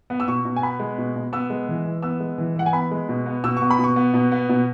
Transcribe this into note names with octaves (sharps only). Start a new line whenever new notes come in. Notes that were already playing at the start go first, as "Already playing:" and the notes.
B3
E6
B2 C#6
B2
G#5
B3 B5
G#3
B2
B2
B3 E6
G#3
E3
E3
B3 E6
G#3
E3
E3 F#5
G#5
B3 B5
G#3
B2
B3
B2 E6
C#6
B3
B5
B2
C#6
B3
B2
B3
B2